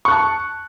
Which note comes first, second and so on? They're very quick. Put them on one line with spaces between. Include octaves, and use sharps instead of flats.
C#6 F#6 A5